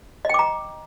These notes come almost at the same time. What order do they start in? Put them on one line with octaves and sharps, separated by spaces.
D#5 G5 D6 A#5